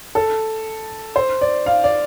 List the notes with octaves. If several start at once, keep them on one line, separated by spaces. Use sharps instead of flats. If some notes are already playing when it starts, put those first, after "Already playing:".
A4
C5
D5
F5
D5